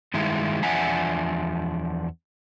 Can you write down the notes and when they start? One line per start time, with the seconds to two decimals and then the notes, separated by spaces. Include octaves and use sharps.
0.14 G2 D#3 G#3 E4
0.63 E2 F3 D4 E5 F#5 G#5